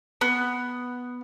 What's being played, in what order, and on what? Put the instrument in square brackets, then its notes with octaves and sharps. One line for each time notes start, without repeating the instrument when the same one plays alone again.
[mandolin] B3